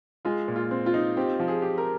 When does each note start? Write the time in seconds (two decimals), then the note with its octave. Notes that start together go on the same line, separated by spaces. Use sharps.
0.25 G#3 F4
0.48 A#2
0.56 F4
0.71 C4
0.86 F4
0.94 D#4
1.17 C4 G4
1.40 F3
1.48 G#4
1.62 G4
1.78 A#4